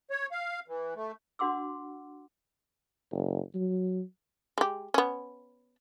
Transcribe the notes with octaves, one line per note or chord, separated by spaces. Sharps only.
C#5
F5
E3
A3
D4 F#4 F#5 C6 D6 E6
F#1
F#3
G#3 G4
B3 C#4